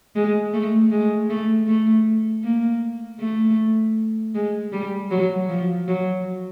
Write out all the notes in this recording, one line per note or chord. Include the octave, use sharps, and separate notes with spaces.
G#3
A3
G#3
A3
A3
A#3
A3
G#3
G3
F#3
F3
F#3